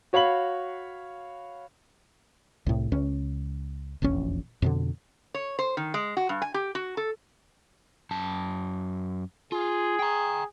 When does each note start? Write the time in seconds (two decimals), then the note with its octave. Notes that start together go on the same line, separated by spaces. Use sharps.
0.13 F#4 C#5 F5 B5 F#7
2.66 C2 A2
2.92 C#2 C#4
4.02 F1 A#1 E2 C#4
4.62 F2 B2 D3
5.34 C#5
5.59 C5
5.77 D#3
5.94 G#3
6.17 F#4
6.29 G2
6.42 G#5
6.54 G4
6.75 F#4
6.97 A4
8.11 F#2 A5
9.52 F4 G#4
9.99 G5 A#5